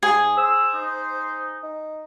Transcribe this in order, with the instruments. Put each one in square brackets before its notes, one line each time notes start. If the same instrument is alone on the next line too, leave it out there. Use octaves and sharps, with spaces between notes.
[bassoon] G#2 [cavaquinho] G#4
[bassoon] C5 [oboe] E6
[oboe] D#4
[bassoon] D#4